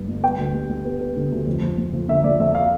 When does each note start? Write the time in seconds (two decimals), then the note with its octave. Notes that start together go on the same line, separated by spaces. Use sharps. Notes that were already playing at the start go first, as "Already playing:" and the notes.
Already playing: G2
0.08 G1
0.23 B3 G5
0.38 D2
0.54 G3
0.70 G3
0.85 B3
1.01 B3
1.16 D3
1.32 D2
1.47 F2
1.62 F3
1.78 F3
1.93 F3
2.08 D3 E5
2.24 F3 D5
2.40 F2 E5
2.55 A3 F5